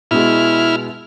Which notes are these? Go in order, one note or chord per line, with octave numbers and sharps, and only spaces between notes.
B2 G#3 E4 F6